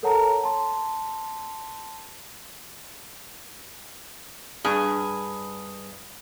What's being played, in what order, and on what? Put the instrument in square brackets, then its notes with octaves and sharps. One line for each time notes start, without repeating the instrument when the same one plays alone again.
[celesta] A4 A#4 C#5 F#5 A5 A#5
A5 C6
[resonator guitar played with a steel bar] G2 [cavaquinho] G#4